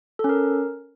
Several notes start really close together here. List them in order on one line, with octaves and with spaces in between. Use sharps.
A4 C#4 A#4